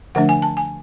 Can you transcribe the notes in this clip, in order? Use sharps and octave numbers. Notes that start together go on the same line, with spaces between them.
D3 F3 A3 D4 F#5
G#5
A5
G#5